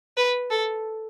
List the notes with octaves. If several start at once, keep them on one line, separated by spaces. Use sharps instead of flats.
B4
A4